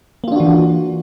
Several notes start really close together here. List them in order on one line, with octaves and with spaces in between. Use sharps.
A#3 F4 D4 F#4 E3